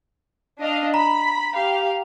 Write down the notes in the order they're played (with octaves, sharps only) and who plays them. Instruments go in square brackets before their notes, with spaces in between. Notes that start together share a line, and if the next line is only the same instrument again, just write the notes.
[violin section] D4 D#5 F5
[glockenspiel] A#5 [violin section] B5
[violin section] G4 F5